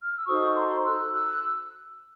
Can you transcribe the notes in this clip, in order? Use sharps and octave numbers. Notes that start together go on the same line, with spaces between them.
F6
E6
D#4 F#4 A4 C5 C#6 D#6
A#5 C6
E6 F#6
E6 F#6